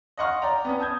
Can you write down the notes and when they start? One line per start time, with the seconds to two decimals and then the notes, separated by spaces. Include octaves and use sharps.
0.18 D#5 F5 F#5 C6 C#6 F6
0.42 D5 G5 A#5
0.65 B3 C#4
0.79 A5 D#6 G6 G#6